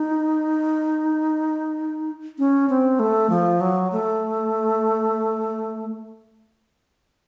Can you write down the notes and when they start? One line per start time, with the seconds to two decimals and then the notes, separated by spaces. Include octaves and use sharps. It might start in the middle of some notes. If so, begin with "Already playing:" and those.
Already playing: D#4
2.38 C#4
2.70 C4
3.00 A3
3.30 F3
3.61 F#3
3.92 A3